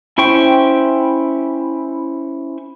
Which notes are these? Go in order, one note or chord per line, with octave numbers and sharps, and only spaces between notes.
C#4 E4 C5 G5 C#6